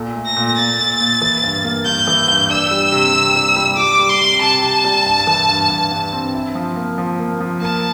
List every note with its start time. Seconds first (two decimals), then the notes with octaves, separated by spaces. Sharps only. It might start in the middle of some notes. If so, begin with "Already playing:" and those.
Already playing: A#2 A4
0.15 A3
0.26 A#6
0.36 A#2
0.57 A#2 A6
0.79 A#2
1.00 A#2
1.22 E3
1.43 G2
1.64 A#3
1.86 G2 G6
2.07 E3
2.28 G2
2.50 D4 E6
2.71 G3
2.92 C3
3.14 C3
3.36 G3
3.56 G3
3.77 G3 D6
3.99 G3
4.09 C6
4.20 C3
4.42 C3 A5
4.63 C3
4.84 G3
5.06 G2
5.27 E3
5.49 G2
5.70 G2
5.91 G2
6.13 C4
6.34 E4
6.55 F3
6.76 A#3
6.98 F3
7.19 A#3
7.40 F3
7.61 A#3 A5